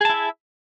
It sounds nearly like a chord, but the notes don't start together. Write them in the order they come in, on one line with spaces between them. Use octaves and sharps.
G#4 A5 E4 E5